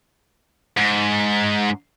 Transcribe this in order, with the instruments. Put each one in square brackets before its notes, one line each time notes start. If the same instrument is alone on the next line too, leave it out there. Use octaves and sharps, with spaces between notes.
[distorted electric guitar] G#2